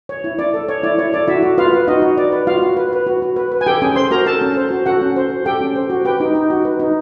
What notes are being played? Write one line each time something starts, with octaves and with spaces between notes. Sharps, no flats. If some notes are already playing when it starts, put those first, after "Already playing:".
C#5
E4
E4 D5
A4
C#5
E4 D5
E4 C#5
A4 D5
E4 F#4 E5
F#4
F4 B4 F5
B4
D#4 F#4 D#5
F#4
B4 D5
B4
F4 F#4 F5
F#4
B4
B4
F#4
F#4
B4
B4
G#5
G4 A4 G5
C#4 G#4 G#5
C5 C6
F#4 A#4 A#5
A4 A5
C#4
C5
F#4
F#4 A4 F#5
C#4
C5
F#4
G4 A4 G5
C#4
C5
F#4
G4 B4 G5
D#4
D#4
F#4
B4
D#4